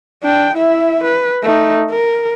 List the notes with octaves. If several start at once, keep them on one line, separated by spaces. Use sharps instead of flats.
D4 G5
E4 E5
B4
A3 D#4
A#4